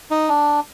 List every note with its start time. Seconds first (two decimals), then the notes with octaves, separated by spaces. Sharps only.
0.11 D#4
0.29 D4